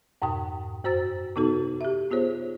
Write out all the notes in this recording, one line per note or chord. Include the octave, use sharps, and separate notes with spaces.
F2 G#2 B2 G5 D#6
F#2 F#4 C5 A#5 E6 A6
C3 B3 D#4 F#4 A4
G4 E5
B3 F4 G#4 C5 C#5